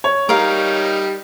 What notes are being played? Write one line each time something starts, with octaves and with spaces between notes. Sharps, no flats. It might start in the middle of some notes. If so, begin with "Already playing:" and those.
C#5
G3 D#4 A#4 F5